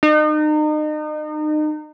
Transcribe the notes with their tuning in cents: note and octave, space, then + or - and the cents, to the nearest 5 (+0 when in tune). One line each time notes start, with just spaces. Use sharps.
D#4 -35